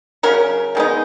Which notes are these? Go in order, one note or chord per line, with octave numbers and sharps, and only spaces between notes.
C#3 F#3 C#4 A#4
D#3 G#3 B3 D#4